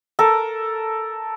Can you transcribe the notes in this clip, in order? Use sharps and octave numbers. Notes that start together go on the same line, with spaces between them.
A4 A#4